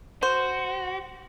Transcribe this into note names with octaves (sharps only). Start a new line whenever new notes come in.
F#4 C5